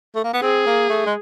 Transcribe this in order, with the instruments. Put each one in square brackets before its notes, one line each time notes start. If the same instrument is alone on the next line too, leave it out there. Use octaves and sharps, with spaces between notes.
[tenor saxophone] A3
A#3
B3
[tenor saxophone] C4 [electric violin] G#4
[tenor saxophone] A#3
A3
G#3